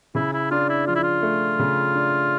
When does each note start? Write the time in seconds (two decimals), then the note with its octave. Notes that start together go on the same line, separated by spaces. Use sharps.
0.15 C#3 E4
0.33 E4
0.51 D4 F4
0.69 E4
0.87 F3 F4
0.95 E4
1.03 F4
1.22 A3
1.59 C#3
1.95 D4